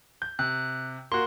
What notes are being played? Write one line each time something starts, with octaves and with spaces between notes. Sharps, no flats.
G6
C3 F#6
A#3 F#4 C6